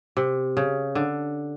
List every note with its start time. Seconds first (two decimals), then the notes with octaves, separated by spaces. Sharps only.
0.17 C3
0.57 C#3
0.95 D3